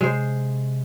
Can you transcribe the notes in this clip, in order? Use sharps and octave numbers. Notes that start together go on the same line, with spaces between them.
C3 G#3 C5